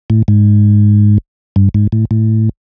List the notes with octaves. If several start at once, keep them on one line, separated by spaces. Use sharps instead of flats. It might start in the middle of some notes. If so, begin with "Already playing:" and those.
A2
G#2
G2
G#2
A2
A2